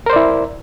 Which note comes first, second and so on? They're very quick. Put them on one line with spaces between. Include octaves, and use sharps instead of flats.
A#4 C5 D5 E4